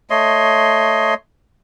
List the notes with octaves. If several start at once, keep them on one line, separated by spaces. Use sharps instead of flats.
A3 C#5 D#5 C6